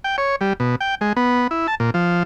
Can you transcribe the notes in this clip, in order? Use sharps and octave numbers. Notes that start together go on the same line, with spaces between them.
G5
C#5
G3
B2
G5
G#3
B3
E4
A5
A#2
F3